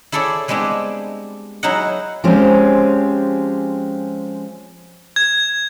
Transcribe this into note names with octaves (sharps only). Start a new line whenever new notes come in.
E4 G#4 A4 C#5 D5
G3 G#3 B3 C4 D4 E4
F#3 D#4 E4 G#4 D#5 F#5
F3 G#3 C4 C#4 G4 C5
G#6